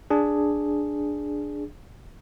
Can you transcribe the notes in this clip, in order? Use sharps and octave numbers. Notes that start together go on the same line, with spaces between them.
D4 G#4